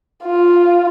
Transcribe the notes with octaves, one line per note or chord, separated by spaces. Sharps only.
F4